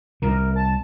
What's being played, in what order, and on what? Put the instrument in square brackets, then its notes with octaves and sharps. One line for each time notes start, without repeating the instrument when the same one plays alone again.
[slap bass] C2 C3 [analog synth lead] A#4
[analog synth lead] A5